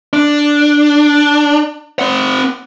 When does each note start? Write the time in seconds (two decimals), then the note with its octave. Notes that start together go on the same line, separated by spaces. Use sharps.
0.13 D4
1.99 C4 F#5